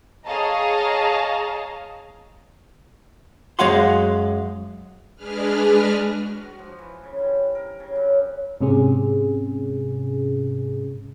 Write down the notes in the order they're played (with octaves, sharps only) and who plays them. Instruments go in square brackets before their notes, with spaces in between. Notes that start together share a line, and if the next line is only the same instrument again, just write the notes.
[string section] G#4 C#5 D#5 F5 A5 A#5
[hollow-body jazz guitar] F#2 G#3 C#5 F5 F#5 C6
[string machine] G#3 D4 G#4 B4 F6
[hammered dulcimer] F#4
F#4
F3
E3
C#3
G2
A#4
C#3
F#2
[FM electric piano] G#2 C3 C#4 G#4